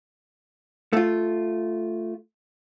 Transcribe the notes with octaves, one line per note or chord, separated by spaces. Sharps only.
A3 F4